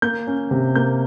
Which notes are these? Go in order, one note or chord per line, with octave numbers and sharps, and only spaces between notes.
A#3 G6
C#4
C3
A#3 G6